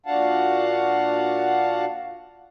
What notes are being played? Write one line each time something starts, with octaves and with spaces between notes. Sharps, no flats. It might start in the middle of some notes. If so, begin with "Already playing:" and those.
A#2 D4 F#4 F5 F#5 A5